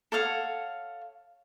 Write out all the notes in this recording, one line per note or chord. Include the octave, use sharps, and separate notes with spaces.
A4 C#5 F5 F#5